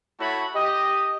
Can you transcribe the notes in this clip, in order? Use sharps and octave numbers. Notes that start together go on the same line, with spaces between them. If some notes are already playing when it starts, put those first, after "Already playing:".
A3 E4 F#4 C#5 A5 B5
G4 D#5